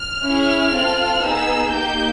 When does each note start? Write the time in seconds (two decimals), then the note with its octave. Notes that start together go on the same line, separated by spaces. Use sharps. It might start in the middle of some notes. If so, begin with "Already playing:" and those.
Already playing: F6
0.24 C#4 E4 G#4
0.73 C4 F4 A4
1.22 B3 D#4 G#4 E6
1.71 A#3 D#4 G4 G6